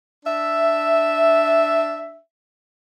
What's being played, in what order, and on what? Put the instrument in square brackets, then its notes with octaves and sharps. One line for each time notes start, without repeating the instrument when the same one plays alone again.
[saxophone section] D4 E5